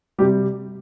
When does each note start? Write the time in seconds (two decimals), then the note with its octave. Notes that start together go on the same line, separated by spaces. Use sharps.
0.18 G3 G4
0.21 C3